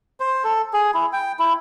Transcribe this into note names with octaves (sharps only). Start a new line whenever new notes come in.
C5
A4
G#4
E4
G5
E4